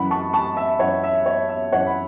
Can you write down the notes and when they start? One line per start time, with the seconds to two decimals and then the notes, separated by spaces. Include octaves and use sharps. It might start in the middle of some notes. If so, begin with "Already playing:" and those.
Already playing: F#2 E3 F#5 B5
0.11 A5 C#6
0.33 A5 C#6
0.57 E5 A5
0.79 F#2 E3 C#5 F#5
1.03 E5
1.26 C#5
1.49 E5
1.72 F#2 E3 C#5 F#5
1.86 B5